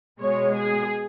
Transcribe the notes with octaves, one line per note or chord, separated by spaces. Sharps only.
B2 G#3 C#5
G#4